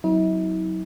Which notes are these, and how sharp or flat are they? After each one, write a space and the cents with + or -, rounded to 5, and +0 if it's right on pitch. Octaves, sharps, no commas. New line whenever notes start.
F#3 +0 C4 +0 E4 -45